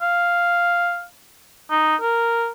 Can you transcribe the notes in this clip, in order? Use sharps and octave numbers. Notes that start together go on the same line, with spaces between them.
F5
D#4
A#4